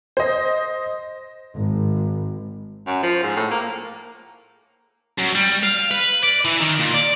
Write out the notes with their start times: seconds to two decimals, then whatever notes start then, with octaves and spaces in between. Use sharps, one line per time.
0.17 C5 D#5
1.55 G#1
2.87 F#2
3.03 F3
3.23 G#2
3.36 A2
3.51 A#3
5.18 F#2
5.35 G3
5.63 F5
5.91 B4
6.24 D5
6.45 E3
6.61 D#3
6.80 A#2
6.94 D5